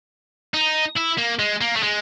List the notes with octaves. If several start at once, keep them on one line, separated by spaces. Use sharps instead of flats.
D#4
E4
A#3
G#3
A#3
A3
G#3